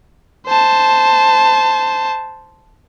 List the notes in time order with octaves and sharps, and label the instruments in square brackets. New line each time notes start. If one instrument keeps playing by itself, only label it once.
[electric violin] C5 A5